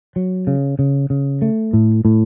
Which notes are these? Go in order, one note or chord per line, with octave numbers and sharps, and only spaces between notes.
F#3
C#3
C#3
C#3
A3
A2
A2